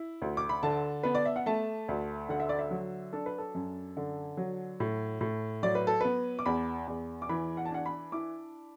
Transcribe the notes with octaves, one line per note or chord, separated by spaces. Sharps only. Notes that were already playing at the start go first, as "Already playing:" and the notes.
Already playing: E4
D2
D6
B5
D3 A5
B3 B4
D5
E5
F#5
A3 A5
D2
D3 F#5
E5
D5
E5
F#3
D4 A4
B4
A4
F#2
D3
F#3
A2
A2
F#3 D5
B4
A4
B3 B4
D6
E2 B5
E2
D6
E3 B5
F#5
A5
D4 F#5
B5
E4 D6